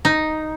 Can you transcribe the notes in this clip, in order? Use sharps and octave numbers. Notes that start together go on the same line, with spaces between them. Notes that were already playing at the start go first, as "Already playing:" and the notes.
D#4